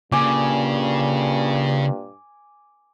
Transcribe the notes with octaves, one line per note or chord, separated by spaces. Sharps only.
G2 A#2 C#3 G#5 D6